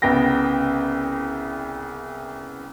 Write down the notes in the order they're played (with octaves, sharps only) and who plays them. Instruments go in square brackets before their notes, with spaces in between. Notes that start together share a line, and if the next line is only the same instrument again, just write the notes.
[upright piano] C2 C#3 B3 G5 A#6